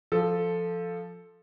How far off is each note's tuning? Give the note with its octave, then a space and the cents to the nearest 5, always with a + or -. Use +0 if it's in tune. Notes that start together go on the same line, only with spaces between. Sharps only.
F3 +0 A4 +0